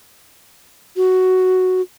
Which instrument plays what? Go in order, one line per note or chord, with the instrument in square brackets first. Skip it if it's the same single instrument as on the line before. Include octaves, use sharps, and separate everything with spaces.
[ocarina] F#4